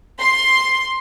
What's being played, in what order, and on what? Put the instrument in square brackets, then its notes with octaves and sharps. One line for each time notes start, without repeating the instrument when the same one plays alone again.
[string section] C6